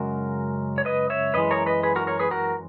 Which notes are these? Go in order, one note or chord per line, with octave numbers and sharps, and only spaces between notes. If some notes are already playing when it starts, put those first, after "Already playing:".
Already playing: F#2 C#3 G#3 F#4 A#4
C#5
B4 D#5
C#5 E5
F#2 E3 G#3 B4 D#5
A#4 C#5
B4 D#5
G#4 B4
F#4 A#4
A#4 C#5
G#4 B4
F#4 A#4